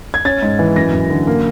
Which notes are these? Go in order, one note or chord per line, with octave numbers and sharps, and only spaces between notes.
G#6
C#4 A6
G#2
E3
F#2 A#6
F#2
D3
A#3